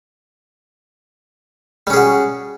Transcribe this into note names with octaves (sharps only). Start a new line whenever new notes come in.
G3 C#4 F#4 G#4